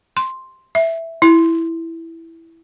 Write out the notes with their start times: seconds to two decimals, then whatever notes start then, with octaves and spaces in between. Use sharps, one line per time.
0.17 C6
0.75 E5
1.22 E4